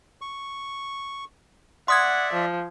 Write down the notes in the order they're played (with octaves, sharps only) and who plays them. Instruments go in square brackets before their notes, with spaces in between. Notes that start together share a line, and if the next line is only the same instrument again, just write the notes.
[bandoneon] C#6
[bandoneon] D5 E5 [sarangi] F#5 [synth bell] C6 D#6 G#6
[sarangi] F3